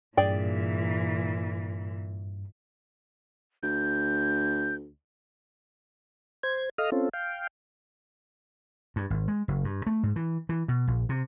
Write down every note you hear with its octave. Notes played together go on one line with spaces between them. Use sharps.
G2 A#2 E3 G#4 D5 G5
D2 G6
C5 G#6
A4 D#5 F5 D#6 F6
C4 C#4 F4 A4
F5 G5
G2
G#1
G#3
F#1
G2
A3
G#2
E3
E3
B2
A#1
C3